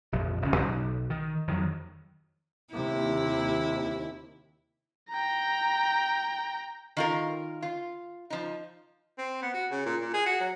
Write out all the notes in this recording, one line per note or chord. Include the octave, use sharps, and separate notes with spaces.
F1 A#1 F2 F3
D1 D2 C#3 C#4
B1
D#3
F2 D#3 F#3
D#2 C3 E4
G5 A#5
D#3 F4 A#4
F4
F3 D#4
C4
B3
F#4
C#3
A#2
A#2
G#4
F#4
F#3